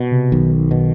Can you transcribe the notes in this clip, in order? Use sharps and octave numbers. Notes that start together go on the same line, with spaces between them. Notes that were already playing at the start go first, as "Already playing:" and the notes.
Already playing: B2
C3
B1 D#3
B2